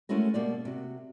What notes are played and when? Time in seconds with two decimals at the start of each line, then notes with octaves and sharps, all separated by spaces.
0.09 G#3 A3 C#4 E4 F#4 A#4
0.34 B2 A#3 G4 D5
0.65 C3 F#4